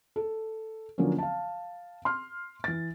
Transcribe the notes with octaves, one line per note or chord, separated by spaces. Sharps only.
A4
D3 F3 F#3 A#3 C#4
F5 A5
C6 F6
E3 A6